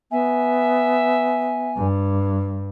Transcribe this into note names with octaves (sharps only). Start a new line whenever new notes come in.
B3 E5 G#5
G2